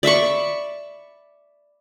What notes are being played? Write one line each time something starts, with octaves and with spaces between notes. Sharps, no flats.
D5 E5 B5 C#6